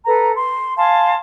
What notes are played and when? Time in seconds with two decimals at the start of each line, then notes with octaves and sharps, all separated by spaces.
0.06 A4 B4 A#5
0.35 C6
0.78 F5 G#5 A5 C6